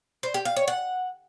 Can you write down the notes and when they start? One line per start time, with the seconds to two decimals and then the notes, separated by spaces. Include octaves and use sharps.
0.23 C5
0.34 G4
0.45 F5
0.57 C#5
0.68 F#5